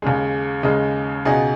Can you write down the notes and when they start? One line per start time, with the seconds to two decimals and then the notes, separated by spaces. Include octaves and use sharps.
0.02 D#2 C#3 G#3 G#4
0.63 D#2 C#3 G#3 D#4
1.25 C#2 B2 B3 D#4 G#4